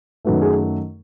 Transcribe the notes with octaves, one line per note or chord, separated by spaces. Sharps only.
F#2 D#3 F#3 A3 B4
G#4